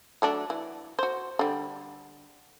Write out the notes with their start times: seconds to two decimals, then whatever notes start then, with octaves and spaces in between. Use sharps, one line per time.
0.22 F#3 A3 D4
0.50 E3
0.99 F#4 C5
1.39 D3 G3